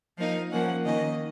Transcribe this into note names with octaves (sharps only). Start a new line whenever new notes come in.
F3 A#3 D#4 F5
F3 A#3 C#4 F#5
D#3 A#3 C#4 D#5